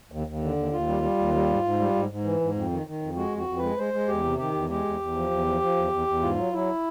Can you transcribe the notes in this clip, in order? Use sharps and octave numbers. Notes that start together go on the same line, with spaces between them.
D#2
D#2
D3
D#2
D#2 F4
G3
G3
D#2
G3
G#2
G#2
G3
G#2
G#2
E3
G#2
F2
D#3
D#3
F2
G#3 F#4
F2 F#4
F2
B4
G#3
G#3 C5
G#3
E2 G4
C3
D#3 G4
E2
G#3 G4
E2
E2
F3
E2
F3
F3
E2
E2
E2
G#2 F4
F#3
F#3 E4